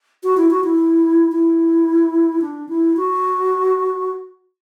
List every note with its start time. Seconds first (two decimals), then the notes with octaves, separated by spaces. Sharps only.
0.23 F#4
0.37 E4
0.51 F#4
0.64 E4
1.32 E4
2.42 D4
2.69 E4
2.97 F#4